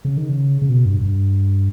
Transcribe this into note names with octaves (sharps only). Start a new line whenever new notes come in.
C#3
D#3
C#3
C#3
B2
G2
G2